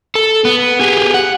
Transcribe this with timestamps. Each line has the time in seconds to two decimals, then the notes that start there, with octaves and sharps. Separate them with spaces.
0.15 A4
0.45 B3
0.81 G4 G#4
1.14 F#5